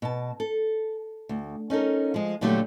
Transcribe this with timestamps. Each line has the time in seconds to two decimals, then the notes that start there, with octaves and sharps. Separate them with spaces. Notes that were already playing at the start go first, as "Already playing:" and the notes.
0.02 B2 A5
0.40 A4
1.29 D2
1.70 C#4 D#4 A4 A#4
2.14 F3 G#3
2.41 A#2 D3 F#3 G3 A3 G4